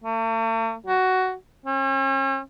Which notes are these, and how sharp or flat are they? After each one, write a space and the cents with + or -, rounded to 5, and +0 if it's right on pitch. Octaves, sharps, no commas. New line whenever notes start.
A3 +45
F#4 +10
C#4 -45